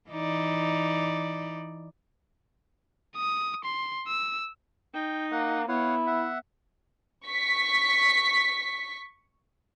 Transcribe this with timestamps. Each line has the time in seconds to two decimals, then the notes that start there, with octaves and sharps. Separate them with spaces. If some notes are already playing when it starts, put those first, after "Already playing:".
0.10 E3 D#4 D5
3.16 D#6
3.64 C6
4.08 E6
4.94 D#4 G5
5.32 A#3 F#5
5.68 B3 E4 C#5 F5 F#5
6.07 E5 F#5
7.26 C#6 B6